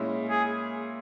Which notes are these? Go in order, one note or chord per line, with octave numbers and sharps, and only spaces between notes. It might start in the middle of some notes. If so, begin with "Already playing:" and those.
Already playing: A#2 G#3 C#4 E4
G#4